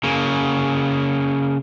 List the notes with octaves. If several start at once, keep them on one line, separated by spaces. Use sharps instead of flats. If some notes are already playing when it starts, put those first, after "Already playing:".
C#3 A#3